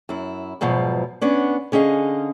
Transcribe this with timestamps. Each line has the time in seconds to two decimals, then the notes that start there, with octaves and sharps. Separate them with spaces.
0.09 F#2 E4
0.61 E2 G#2 B2 F3 F#3
1.21 B3 C#4 D4
1.72 D3 C#4 G#4 D#5 F5